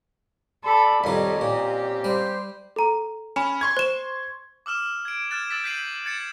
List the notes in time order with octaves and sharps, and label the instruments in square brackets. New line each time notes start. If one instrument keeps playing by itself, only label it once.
[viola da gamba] A4 [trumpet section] D5 B5
[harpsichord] F2 D#3 [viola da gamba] G3 [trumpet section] A4 C#5 [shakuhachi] D#5
[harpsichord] A#2 [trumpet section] A#3 C4 C#4 [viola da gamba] G4
[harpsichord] G3 [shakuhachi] C5
[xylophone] A4 A#5
[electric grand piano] C#4 [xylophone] G#5 B5
[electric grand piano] C6 C#6 G#6
[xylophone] C5 E7
[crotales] D6 E6 F6 E7
G#6 D7
F6 F#6 G#6 A6 E7
E6 A6 B6 E7
G6 A6 B6 C7 D#7 F#7
G#6 A6 C#7 E7